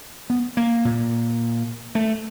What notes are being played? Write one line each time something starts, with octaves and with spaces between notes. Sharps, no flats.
B3
A#3
A#2
A3